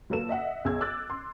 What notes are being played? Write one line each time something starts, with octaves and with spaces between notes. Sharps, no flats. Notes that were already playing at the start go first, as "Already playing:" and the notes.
A#2 F#3 A#3 A4 B4 E7
D#5 E5 F#5
B1 G#4 E6 G#6
D6 E6 F#6 A6
C6